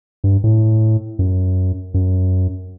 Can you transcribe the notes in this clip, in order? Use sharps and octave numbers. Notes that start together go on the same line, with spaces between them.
G2
A2
F#2
F#2